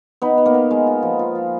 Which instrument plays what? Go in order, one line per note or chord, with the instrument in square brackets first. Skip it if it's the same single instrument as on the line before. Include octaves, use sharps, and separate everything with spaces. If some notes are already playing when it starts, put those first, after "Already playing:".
[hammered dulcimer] B3 D#4 B4
B3
A#3 A#4
B3
G#3
F4
F3
F4
F4